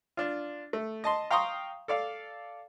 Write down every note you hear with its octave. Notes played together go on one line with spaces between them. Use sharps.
D4 F4
A3
D#5 A5 C6
F5 G5 A#5 C6 C#6 D#6
A4 D5 F5